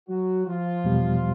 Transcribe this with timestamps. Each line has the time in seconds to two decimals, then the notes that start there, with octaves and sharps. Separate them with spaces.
0.09 F#3 F#4
0.47 F3 F4
0.84 E2 B2 G3